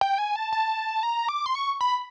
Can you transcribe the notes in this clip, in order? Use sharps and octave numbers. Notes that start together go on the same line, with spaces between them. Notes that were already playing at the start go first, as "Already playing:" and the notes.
G5
G#5
A5
A5
A#5
D6
C6
C#6
B5